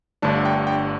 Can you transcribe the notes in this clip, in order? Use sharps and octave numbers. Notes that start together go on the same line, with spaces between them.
G1 G2 D3 A3 D4 A5
G5
G5